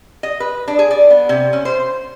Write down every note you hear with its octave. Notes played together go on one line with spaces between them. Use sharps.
D#5
B4
D4
G#4
D5
B3
C3
C#4
C5